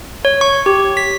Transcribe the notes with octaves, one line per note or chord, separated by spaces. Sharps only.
C#5
C#6
G4
B6